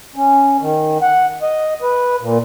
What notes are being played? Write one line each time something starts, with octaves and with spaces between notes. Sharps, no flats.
C#4
D#3
F#5
D#5
B4
A#2